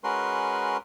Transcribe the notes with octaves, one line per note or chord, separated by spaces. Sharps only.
G#3 C#4 F#4 A#4 B4 C6